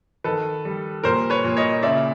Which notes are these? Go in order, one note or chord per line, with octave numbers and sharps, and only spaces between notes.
D#3 A4 B4
G3
A#2 A#4 C5
B4 C#5
A#2
C#5 D#5
C#3 D5 E5